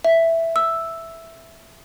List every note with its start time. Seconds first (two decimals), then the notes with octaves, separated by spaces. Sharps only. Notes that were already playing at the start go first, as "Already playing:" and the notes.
0.04 E5
0.56 E6